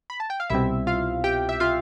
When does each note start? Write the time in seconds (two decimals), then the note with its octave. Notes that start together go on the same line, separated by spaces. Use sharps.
0.10 B5
0.20 A5
0.30 G5
0.40 F5
0.50 C2 B2 G3 C4 E4 E5
0.87 F4 F5
1.24 G4 G5
1.49 E5
1.60 F4 F5